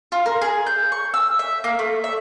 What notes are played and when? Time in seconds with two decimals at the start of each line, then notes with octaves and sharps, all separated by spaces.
0.12 F4
0.26 A#4
0.41 G#4
0.66 G6
0.92 C#6
1.14 E6
1.39 E5
1.64 A#3
1.79 A3
2.04 E5